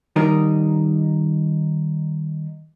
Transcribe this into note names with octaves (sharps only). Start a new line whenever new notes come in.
D#3 G3 D#4 A#4